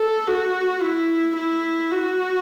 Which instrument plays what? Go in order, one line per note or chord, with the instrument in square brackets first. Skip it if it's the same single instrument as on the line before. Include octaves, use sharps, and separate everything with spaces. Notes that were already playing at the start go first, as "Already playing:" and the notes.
Already playing: [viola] A4
F#4
E4
E4
F#4